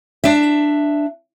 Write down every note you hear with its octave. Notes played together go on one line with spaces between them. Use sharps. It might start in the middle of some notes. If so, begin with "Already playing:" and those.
D4 E5